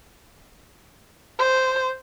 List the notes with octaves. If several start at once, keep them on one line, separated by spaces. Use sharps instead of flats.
C5